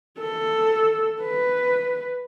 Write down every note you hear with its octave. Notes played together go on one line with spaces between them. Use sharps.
A4
B4